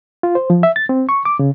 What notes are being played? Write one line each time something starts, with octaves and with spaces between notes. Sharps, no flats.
F4
C5
F3
E5
A6
C4
C#6
D6
C#3